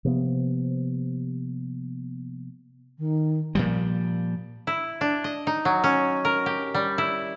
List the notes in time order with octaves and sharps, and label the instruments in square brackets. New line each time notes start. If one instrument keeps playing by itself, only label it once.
[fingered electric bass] C3 F3 A#3 B3
[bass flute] D#3
[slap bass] A#2 F3 G3
[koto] E4
D4
D#5
D#4
F#3
C#4
A#4
G4
G3
E4